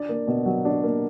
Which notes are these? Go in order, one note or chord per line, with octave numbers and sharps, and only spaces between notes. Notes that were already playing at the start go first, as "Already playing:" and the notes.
Already playing: D4 D5
A#3
B2
F#3
D4
A#3